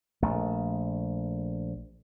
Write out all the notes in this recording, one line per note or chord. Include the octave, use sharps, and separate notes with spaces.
A#1 A3